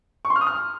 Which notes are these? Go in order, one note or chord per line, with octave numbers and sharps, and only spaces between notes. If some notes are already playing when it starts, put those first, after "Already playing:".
C#6
C6
F6
D#6
F6